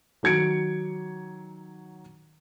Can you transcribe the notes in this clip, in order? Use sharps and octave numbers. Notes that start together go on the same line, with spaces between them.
D#3 F#3 G#6 C#7 D7